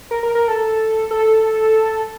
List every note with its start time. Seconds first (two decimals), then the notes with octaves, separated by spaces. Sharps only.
0.11 A#4
0.23 A#4
0.35 A#4
0.48 A4
1.11 A4